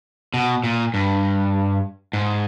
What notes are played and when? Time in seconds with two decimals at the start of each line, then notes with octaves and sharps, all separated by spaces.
0.34 B2
0.64 A#2
0.94 G2
2.13 G#2